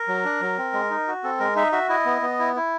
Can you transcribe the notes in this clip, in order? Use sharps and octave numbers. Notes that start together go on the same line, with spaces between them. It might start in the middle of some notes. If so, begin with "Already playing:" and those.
Already playing: A#4
F#3
D4
F#3
C4
G#3
D#4
F#4
C4 A4
G#3 A#4
D#4 E5
F#4 E5
E4 D#5
B3
B3
E4
E4